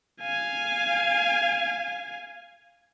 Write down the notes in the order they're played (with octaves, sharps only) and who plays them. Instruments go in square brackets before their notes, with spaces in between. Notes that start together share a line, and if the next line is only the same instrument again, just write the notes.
[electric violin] F5 G#5